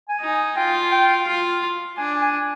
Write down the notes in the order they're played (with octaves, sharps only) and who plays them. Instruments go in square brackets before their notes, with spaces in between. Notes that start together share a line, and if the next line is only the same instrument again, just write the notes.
[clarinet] G#5
[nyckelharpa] D#4
[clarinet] G#5
[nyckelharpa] F4 [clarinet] G5
[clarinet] G5
[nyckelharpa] F4
[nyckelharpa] D4 [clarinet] G#5
[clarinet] G#5